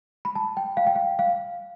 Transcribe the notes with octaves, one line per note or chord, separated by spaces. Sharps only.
B5
A5
G5
F5
G5
F5
F5